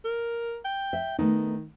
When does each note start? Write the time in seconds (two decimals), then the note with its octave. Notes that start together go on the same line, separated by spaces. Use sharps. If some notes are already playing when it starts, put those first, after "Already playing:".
0.05 A#4
0.65 G5
0.93 E5
1.19 D#3 A3 B3 D#4